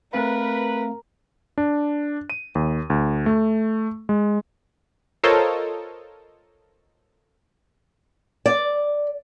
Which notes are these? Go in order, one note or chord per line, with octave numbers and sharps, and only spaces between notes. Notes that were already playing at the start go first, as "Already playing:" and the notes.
A3 C4 A#4 B4 F5
D4
D#7
D#2
D2
A3
G#3
F4 A4 A#4 C5 C#5 D#5
D5